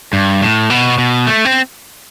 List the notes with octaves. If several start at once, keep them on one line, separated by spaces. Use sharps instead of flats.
G2
A2
B2
B2
A3
C4